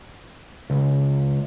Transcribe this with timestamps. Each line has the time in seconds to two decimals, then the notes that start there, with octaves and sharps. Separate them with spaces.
0.70 C#2